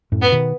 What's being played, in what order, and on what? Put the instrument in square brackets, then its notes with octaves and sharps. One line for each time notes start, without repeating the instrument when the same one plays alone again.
[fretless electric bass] F#2 A2
[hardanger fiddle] B3
[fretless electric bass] B2 D#3